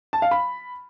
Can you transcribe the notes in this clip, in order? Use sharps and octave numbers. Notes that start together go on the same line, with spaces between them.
A5
F5
B5